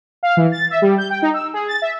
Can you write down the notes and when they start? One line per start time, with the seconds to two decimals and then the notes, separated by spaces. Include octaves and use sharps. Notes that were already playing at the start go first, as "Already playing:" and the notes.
0.23 F5
0.37 E3
0.52 A6
0.70 E5
0.82 G3
0.98 G6
1.10 G5
1.22 D#4
1.34 E6
1.54 G#4
1.68 A6
1.82 E5